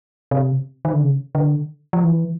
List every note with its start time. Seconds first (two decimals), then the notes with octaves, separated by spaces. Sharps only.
0.31 C3
0.85 D#3
0.93 D3
1.00 C#3
1.35 D3
1.93 F3
2.04 E3